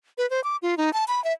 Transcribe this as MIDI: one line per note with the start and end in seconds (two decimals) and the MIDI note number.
0.18 0.28 71
0.30 0.43 72
0.44 0.57 86
0.62 0.77 65
0.77 0.92 63
0.93 1.05 81
1.08 1.23 83
1.24 1.33 76